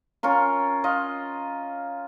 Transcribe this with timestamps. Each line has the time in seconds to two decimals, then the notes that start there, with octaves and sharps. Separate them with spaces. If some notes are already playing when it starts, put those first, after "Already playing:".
0.23 C#4 F4 A#4 C#6
0.84 F4 D#5